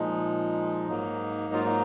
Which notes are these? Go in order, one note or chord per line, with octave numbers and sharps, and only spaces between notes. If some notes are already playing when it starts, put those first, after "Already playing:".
Already playing: A#2 F3 G#3 D#4
G#2 F#3 A#3
F4
D#4